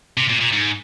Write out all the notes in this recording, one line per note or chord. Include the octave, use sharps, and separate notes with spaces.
C3
A#2
A#2
G#2